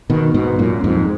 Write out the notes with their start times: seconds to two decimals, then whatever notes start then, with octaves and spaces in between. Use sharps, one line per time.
0.10 B2 D#3
0.34 G#2 B2
0.59 F#2 A#2
0.84 F2 G#2